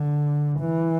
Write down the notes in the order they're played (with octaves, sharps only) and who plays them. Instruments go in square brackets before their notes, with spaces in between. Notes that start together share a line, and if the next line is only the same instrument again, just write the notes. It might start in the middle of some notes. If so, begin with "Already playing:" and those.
Already playing: [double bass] D3
E3